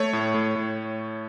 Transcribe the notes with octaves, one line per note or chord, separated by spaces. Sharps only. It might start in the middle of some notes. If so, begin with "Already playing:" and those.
Already playing: A3 C#5
A2
A2
A2